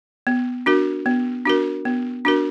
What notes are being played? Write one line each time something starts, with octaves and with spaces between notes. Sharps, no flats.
B3
D4 F#4 A#4
B3
D4 F#4 A#4
B3
D4 F#4 A#4